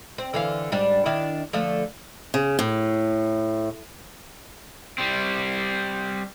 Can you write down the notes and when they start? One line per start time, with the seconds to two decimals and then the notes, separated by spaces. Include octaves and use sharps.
0.18 C4
0.34 D3 E3 F5
0.72 G#2 G3 D4
1.06 D#3 D4 E4
1.53 D3 F3 A3
2.34 C#3
2.59 A2
4.98 G3 C4